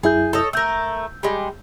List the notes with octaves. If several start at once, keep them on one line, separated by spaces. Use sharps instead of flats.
F#2 E4 G#4 G6
A4 C#5 D#5
A3 A#4 E6 G6
G3 G#3